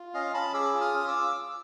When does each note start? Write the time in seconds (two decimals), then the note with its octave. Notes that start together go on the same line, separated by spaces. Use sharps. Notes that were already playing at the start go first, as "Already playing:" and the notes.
Already playing: F4
0.14 C#4 D#5 F5
0.34 C#4 A5 B5
0.54 G#4 D6 E6
0.74 F4
0.81 D#6 F6
0.94 C#4
1.08 D6 E6